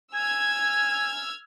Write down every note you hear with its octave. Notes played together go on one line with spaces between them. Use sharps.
G#5 E6 F6 G#6